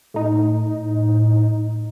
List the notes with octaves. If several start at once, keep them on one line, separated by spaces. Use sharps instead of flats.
A2 D#4